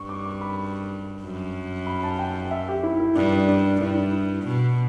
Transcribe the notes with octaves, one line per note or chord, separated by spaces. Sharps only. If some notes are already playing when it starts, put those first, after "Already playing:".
Already playing: G2 C#6
D6
C#6
B5
C#6
F#2
B5
A5
G5
E5
G4
E4
E4
G2 D4
D4
G2 E4
D4
E4
B2